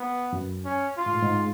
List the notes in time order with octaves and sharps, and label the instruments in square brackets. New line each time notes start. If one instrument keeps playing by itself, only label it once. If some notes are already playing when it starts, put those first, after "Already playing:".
Already playing: [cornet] B3
[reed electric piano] F#2
[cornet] C#4
F4
[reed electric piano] G#2
A2
G#2